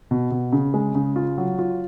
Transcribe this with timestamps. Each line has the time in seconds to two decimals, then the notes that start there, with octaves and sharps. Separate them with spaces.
0.11 B2
0.31 B2
0.53 C#3
0.74 G#3
0.95 C#3
1.16 F4
1.38 F#3
1.59 F4